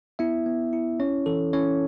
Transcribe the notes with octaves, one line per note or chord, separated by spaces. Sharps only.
B3 E4 E5
B3
E4
C#4 C#5
E3 A4
C#4 E4 C#5